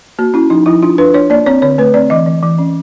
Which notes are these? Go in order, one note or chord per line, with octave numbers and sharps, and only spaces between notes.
A#3 F#4
C#4 E4
F3 D#4
F3 E4
D4 F4
D4 B4
D4 C#5
A#3 D5
C4 C#5
D3 C#5
A3 B4
C4 D5
E3 D#5
E3
E3
C#4